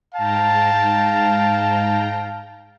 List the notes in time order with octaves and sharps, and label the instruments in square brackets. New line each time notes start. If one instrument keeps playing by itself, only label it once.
[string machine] G#2 G5 A#5 [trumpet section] F5 A5